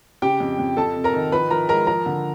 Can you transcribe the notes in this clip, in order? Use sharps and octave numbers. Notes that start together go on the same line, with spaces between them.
C#3 G4 G5
F2
F2
F2 A4 A5
C3
A#4 A#5
D#3
F3 B4 B5
F3 A#4 A#5
G#3 A#4 A#5
F3 A#4 A#5
D3